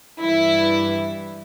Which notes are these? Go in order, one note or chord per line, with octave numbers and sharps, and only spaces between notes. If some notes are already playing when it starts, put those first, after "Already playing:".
G2 E3 G3 E4